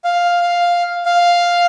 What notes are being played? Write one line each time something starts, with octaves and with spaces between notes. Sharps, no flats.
F5
F5
F5